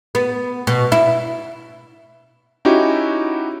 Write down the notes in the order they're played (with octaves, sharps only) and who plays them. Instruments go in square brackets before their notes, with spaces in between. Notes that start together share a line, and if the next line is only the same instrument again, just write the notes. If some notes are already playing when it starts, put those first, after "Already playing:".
[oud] B3
B2
E4
[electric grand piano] C#4 D#4 E4 F#4 G4